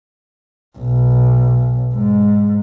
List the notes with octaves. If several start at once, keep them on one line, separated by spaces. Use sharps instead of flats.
B1
G#2